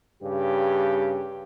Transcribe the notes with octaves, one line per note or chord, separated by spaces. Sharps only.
G2 C#3 G4